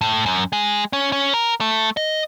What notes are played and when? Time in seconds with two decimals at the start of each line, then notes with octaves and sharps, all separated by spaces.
0.01 A2
0.26 F#2
0.53 G#3
0.93 C#4
1.12 C#4
1.34 A#4
1.61 A3
1.97 D#5